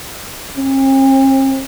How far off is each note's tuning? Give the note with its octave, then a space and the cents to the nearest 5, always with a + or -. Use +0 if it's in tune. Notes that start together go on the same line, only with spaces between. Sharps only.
C4 +45